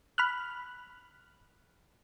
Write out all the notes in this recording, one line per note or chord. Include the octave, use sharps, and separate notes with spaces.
B5 F6 F#6